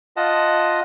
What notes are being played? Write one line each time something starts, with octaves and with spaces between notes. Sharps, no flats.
F4 D#5 F#5 A5